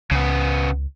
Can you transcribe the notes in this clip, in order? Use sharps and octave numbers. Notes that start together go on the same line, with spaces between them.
C#2 C#3 B3